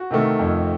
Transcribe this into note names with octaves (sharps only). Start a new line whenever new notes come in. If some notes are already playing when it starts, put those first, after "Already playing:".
Already playing: F#4
C3 D#3 A3
F2